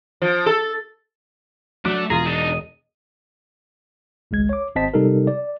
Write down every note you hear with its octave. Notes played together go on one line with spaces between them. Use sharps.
F3
A4
F#3 A3 D4 F#4 D5
E1 F4 G#4 A#5
D4 D#4 D#5
G#1 C#2 G#3 G#6
C#5 D6
G#1 C4 C5 D#5 A5 B6
C3 G3 D#4 A4 A#4
D5